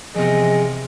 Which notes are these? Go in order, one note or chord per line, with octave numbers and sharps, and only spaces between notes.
E2 C3 F3 G#4 D#5